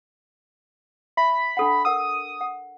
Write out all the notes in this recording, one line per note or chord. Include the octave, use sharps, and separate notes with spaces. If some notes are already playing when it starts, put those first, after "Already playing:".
E5 B5
D4 A4 F#5
A#4 F#5 D#6 E6
F#5